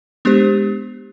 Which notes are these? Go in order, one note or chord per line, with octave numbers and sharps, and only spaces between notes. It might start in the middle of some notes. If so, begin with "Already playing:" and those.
G#3 B3 D4 G4 C5